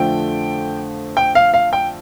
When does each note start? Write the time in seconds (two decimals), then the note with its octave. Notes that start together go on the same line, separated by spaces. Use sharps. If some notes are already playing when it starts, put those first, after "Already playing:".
Already playing: F2 D3 F3 A3 G5
1.17 G5
1.35 F5
1.54 F5
1.73 G5